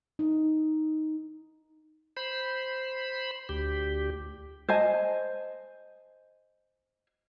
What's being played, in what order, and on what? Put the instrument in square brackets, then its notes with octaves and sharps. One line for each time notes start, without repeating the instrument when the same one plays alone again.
[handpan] D#4
[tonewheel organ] C5 B5
D2 G4
[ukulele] C5 D#5 G#5 A5